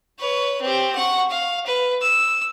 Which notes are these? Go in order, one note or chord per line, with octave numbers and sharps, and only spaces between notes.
B4 C#5
C4 G4
F#5 C#6
F5
B4
E6